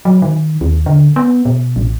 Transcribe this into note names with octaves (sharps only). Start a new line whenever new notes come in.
F#3
D#3
D#2
D3
B3
B2
A1